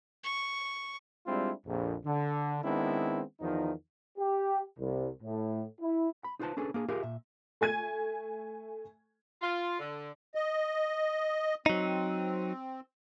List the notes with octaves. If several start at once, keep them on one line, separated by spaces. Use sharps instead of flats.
C#6
G3 G#3 C4 D4 E4 F4
A#1 F2
D3
D#3 G#3 B3 C4 D4 E4
E2 D#3 F3 D#4
G4
C2
A2
E4
B5
D#4 F4 G4 B4 C5 A5
C#4 D4 G#4 A4 B4
A#3 D4 G#4
F4 G4 G#4 A#4 E5 F5
A#2 E5
A3 G#5 G#6 D#7
F4
D3
D#5
F#3 C4 D#4